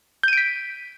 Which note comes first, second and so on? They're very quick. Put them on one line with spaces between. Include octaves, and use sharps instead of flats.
G6 D#7 D7 B6